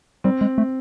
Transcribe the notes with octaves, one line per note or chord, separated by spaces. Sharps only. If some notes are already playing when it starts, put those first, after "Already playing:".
G3 C4
G#3
A3